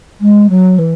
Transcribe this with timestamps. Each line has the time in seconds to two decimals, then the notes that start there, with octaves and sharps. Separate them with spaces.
0.20 G#3
0.49 F#3
0.78 E3